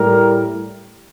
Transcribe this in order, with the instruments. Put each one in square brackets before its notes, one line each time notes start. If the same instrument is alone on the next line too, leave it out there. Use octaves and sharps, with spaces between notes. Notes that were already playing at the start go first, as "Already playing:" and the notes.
Already playing: [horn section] A2 G3 A#4